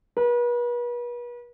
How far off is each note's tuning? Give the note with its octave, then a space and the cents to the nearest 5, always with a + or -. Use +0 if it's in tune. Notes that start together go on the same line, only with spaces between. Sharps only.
B4 -40